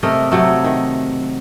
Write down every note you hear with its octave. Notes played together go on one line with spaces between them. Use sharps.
C3 A3 A#4 D#5
C3 F#3 A3
D#3